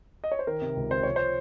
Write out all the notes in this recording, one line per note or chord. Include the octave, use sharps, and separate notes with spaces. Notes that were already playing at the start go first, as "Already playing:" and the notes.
D#5
C#5
C5
D#3 A#4
C3
C#2
C3 C5
F3 C#5
C5